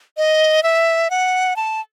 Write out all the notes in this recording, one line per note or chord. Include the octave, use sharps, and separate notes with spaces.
D#5
E5
F#5
A5